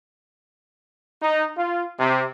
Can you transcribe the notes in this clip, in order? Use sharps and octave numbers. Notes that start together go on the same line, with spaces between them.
D#4
F4
C3